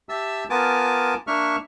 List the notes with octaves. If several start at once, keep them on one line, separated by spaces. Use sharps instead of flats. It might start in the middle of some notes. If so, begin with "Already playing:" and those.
G4 E5 A5 E6
B3 F4 A#4 G#5 A5 D6
A#3 D4 E5 C#6 F6